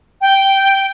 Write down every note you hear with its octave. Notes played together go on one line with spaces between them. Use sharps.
G5